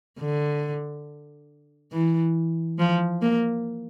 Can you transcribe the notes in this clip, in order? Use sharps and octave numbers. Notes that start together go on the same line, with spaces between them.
D3
E3
F3
A#3